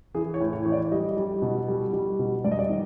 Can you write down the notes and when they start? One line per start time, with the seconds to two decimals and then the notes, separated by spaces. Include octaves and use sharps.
0.14 E3 G#4
0.34 C#5
0.40 A2
0.53 C#5
0.65 E3 C#5
0.72 D5
0.92 G3 D#5
1.17 G3
1.42 B2
1.68 G3
1.93 G3
2.19 B2
2.44 G2 D5
2.52 D#5
2.59 D5
2.70 D#3